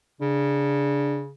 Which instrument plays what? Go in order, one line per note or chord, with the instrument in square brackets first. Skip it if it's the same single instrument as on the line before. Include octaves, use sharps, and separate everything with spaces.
[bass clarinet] C#3 [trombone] D4